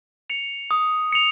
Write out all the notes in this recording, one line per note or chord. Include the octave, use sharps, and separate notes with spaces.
C#7 F7
D#6
C#7 F7